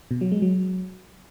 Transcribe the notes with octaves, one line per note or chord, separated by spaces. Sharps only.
B2
F#3
G#3
F#3